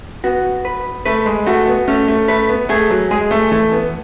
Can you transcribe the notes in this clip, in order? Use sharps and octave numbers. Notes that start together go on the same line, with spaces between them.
B3 F#4
B4
A3 B4
G#3
A3 F#4
B3
A3 C#4
A3
A3 B4
B3
A3 G#4
F#3
G#3 G#4
A3
E3 A3
B3